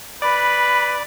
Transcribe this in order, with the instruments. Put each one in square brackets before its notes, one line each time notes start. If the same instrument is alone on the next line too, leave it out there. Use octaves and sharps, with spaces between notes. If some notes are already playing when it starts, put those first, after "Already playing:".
[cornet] B4 [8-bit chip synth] D5 [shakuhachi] B5